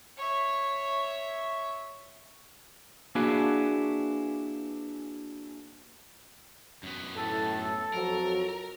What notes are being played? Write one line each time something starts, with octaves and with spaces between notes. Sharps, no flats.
C#5 E5
A#3 D4 E4 F#4 G#4 B4
F#2 B3
A2 A4
F2 F#3 A#4